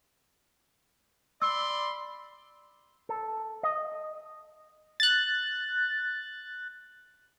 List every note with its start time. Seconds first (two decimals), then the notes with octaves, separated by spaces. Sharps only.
1.42 D5 B5 C6 E6
3.09 A4
3.63 D#5
5.00 F#6 A6